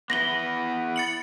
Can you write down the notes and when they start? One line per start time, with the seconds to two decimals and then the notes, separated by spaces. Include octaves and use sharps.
0.10 B3 E4 B4 A#6 F#7 G7
0.96 A6 C#7 F#7